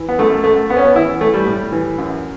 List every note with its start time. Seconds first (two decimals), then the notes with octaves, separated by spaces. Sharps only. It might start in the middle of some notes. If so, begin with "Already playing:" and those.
Already playing: E3
0.09 B3
0.19 F#2 A3
0.44 F#2 A3
0.69 F#2 B3
0.77 C#4
0.85 B3
0.96 E3 E4
1.21 E3 A3
1.34 G3
1.47 A2
1.72 E3
1.98 F#2